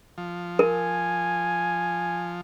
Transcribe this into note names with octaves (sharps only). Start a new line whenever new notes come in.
F3
A#4 G#5